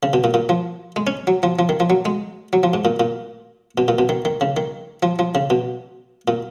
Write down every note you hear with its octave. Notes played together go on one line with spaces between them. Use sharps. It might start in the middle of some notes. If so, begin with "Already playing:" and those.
C#3
B2
A#2
A#2
F3
G#3
C#4
F#3
F3
F3
D#3
F3
F#3
G#3
F#3
F3
G#2
A#2
A#2
B2
A#2
B2
D#3
D#3
C#3
D#3
F3
F3
C#3
B2
A#2